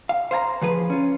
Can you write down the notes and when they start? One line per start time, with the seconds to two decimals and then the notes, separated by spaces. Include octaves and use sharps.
0.09 F5
0.31 C5 F5 G#5 A#5
0.61 E3 F3 G#4 B4
0.90 C#4 F4